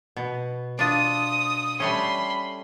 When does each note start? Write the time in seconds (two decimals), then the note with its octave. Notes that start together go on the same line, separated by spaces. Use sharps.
0.17 B2
0.79 D4 F4 D#6
1.80 G3 A3 C#4 B5 C6